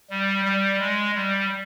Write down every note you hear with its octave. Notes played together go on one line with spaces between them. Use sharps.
G3
G3
G#3
G3